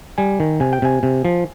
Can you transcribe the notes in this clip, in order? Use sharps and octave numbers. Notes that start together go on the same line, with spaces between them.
G3 G#5
D#3
C3 G#5
G5
C3 G#5
C3
F3